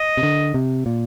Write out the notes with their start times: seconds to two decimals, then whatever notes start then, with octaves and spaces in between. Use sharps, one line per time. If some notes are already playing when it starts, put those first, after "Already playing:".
Already playing: D#5
0.17 C3
0.23 D3
0.54 C3
0.86 A#2